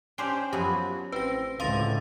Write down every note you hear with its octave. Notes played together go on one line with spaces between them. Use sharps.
C#4 D4 G4 C5 G5
F#2 F3 F#3 B3 G4
A1 C4 B4 A#6
C#2 A2 D3 D#5 F5 C6 A6